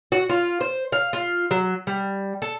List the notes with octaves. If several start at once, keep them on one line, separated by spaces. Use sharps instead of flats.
F#4
F4
C5
F5
F4
F#3
G3
A4